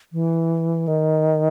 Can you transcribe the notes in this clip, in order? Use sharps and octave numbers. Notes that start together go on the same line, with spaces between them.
E3
D#3